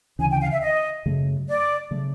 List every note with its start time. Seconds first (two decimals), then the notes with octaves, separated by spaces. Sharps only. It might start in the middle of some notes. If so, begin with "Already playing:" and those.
0.19 D2 C#3 E3 G#5
0.31 G5
0.41 F5
0.52 E5
0.62 D#5
1.06 F#2 C#3 F#3 A3
1.49 D5
1.91 C#3 F#3 A3